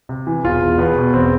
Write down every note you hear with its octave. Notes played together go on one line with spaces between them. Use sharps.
C3
E3
E1 F4
E1
E2 B3
B2
E1 C4